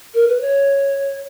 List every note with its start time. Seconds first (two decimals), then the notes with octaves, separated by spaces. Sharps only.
0.14 A#4
0.28 B4
0.41 C#5